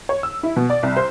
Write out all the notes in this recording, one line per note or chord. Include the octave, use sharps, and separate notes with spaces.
C#5
E6
E4
B2
D5
C2
C5